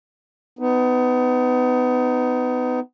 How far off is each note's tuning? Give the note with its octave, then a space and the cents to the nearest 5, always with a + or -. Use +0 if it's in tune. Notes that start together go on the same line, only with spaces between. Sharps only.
B3 +25 D#4 +0